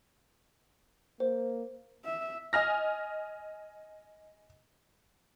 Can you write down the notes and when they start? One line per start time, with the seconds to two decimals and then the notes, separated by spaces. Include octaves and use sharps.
1.20 A#3 C5
2.05 E5
2.53 D#5 G#5 F6 A#6